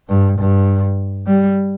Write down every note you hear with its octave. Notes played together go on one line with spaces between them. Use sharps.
G2
G2
G3